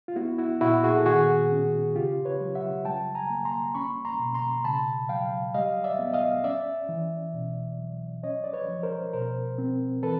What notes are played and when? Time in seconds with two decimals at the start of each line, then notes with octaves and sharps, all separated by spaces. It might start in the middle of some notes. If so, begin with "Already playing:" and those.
0.08 F4
0.16 B3 E4 F#4
0.38 E4 F#4
0.61 A#2 E4 F#4
0.84 F#4 G#4
0.97 A4
1.06 D#3 F#4 G#4
1.51 C#4
1.95 C#3 F4 G4
2.25 B4 C#5
2.41 F#3
2.55 E5 F#5
2.85 G3 G5 A5
3.15 G#5 A#5
3.30 A#3
3.45 A#5 C6
3.75 C#4 B5 C#6
4.05 A#5 C6
4.19 B2
4.34 A#5 C6
4.64 C#3 A5 B5
5.09 F#3 F5 G5
5.54 G3 D#5 F5
5.84 D5 E5
5.99 B3
6.14 D#5 F5
6.44 C#4 D5 E5
6.89 E3
7.34 B2
7.79 F#3
8.23 C#4 C#5 D#5
8.44 D5
8.53 B4 C#5
8.68 F3
8.83 A#4 C5
9.13 B2 A#4 C5
9.58 C4
10.03 E3 A4 B4